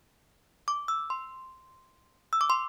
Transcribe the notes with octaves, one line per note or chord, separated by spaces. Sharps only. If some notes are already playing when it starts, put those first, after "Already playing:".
D6
E6
C6
E6
D6
C6